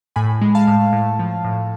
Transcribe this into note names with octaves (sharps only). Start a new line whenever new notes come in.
A2 G#5 B5
G#3
F5 A5
A2
A2
F3
A2